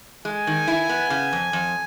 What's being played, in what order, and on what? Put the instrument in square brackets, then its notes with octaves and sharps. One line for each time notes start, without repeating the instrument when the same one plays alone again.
[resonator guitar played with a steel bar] G#3 [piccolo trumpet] G#5
[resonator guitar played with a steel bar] D#3
E4
B3
C#3
F2
F2